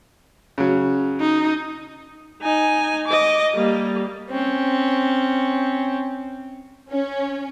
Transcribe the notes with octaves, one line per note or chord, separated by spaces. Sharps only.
C#3 F#3
D#4
D#4 G#5
D#5 D6
G3 A#3
C4 C#4
C#4